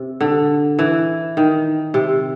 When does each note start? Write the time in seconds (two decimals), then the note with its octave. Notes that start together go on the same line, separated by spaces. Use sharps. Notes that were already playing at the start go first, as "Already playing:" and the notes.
Already playing: C3
0.21 D3
0.79 E3
1.37 D#3
1.94 C3